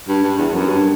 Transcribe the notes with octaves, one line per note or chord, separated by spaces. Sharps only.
G2
G2
E2
F#2
G2